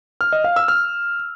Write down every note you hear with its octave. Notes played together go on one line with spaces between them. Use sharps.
F6
D#5
F5
E6
F6